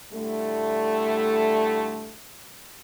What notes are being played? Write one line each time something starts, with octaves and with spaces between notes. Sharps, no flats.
A2 D3 G3 A3